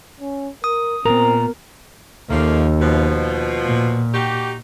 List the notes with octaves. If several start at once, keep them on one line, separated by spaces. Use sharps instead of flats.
C#4
A#4 D#6
A#2 B3 C4 A#4 A#5
D#2 F3 A3 A#3
B2 F3
A#2
D#4 F#4 G4